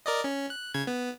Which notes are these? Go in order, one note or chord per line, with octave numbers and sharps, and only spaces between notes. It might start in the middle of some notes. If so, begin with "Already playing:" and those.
A#4 D5 D#5
C#4
F#6
C#3 G#6
B3